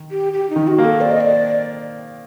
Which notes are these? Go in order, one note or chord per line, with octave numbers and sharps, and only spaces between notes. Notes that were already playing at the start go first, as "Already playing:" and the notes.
Already playing: D#3
G4
G4
D#4
D#3
F#4
A#3
A4
C4 D5
D#5
D5